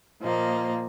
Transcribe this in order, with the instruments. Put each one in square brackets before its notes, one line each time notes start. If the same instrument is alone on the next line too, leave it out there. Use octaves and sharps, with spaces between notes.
[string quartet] A#2 F3 A#3 D#5